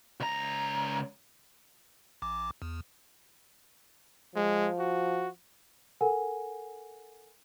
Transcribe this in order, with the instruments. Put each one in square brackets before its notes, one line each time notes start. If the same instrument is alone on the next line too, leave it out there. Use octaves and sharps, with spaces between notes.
[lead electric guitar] C#2 A#5
[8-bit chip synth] A1 D6
E2
[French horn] F3 [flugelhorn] G#3
[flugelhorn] F#4
[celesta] A4 A#4 F#5 G#5